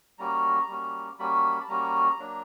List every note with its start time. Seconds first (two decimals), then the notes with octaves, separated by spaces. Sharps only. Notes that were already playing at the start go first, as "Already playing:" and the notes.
0.19 G3 A#3 C#4 F#4 A#5
0.69 G3 A#3 C#4 F#4
1.19 G3 A#3 C#4 F#4 B5
1.61 A5
1.69 G3 A#3 C#4 F#4 A#5
2.19 F#3 A#3 D4